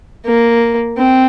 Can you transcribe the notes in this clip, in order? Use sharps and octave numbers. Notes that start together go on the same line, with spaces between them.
A#3
C4